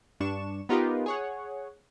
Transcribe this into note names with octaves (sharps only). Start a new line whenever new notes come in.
G2 D4 C#6 E7
B3 D#4 F4 G4 A#4 B4
G#4 C#5 F#5